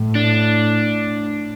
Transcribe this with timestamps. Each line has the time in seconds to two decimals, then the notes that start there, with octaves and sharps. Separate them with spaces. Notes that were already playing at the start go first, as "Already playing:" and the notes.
Already playing: A2
0.15 D4